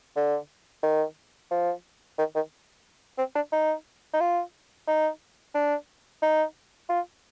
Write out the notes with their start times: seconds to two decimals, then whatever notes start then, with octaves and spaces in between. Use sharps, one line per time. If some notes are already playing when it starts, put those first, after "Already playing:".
0.16 D3
0.83 D#3
1.51 F3
2.18 D#3
2.35 D#3
3.18 C4
3.35 D4
3.53 D#4
4.14 D#4
4.21 F4
4.87 D#4
5.55 D4
6.22 D#4
6.90 F4